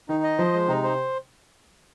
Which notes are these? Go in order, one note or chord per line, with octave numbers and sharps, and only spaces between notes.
D#3 D#4
D#5
F3 C5
G#3
C3 D#4
C5